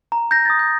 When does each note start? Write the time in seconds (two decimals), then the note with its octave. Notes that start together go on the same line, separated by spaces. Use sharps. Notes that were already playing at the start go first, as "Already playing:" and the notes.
0.12 A#5
0.31 G6 A#6
0.45 D#6 A6
0.59 G6